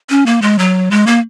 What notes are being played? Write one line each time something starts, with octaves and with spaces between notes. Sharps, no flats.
C#4
A#3
G#3
F#3
G#3
A#3